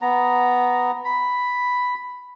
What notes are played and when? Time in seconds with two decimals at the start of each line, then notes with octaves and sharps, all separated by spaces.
0.02 B3 A#5
1.05 B5